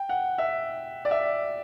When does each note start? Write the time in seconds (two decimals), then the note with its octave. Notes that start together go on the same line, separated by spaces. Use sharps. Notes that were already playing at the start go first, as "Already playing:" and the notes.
Already playing: G5
0.09 F#5
0.38 E5
1.05 D5
1.11 E5